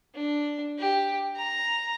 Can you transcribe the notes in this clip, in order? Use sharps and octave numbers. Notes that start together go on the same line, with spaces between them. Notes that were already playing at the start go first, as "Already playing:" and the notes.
D4
G4
A#5